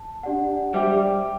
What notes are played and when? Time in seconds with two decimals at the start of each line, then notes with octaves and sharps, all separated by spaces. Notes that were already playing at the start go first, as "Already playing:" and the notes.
Already playing: A5
0.23 D4 G4 D5 F#5
0.74 G3 C5 E5 G5 D6